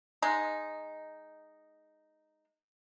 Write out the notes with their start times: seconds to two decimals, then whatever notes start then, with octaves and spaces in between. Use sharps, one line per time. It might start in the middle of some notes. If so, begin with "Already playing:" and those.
0.22 G#3 D#4